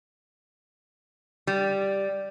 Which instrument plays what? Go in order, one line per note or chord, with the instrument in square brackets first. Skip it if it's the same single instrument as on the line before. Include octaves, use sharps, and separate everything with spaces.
[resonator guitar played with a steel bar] G3